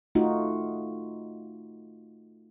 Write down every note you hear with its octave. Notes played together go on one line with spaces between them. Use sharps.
A3 D#4 F4 F#4